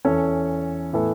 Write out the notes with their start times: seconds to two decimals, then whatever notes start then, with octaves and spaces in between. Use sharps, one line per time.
0.05 E2 E3 C#4 A4 C#5
0.93 A2 E3 B3 E4 A4